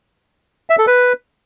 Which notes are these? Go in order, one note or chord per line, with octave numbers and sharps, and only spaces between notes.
E5
A4
B4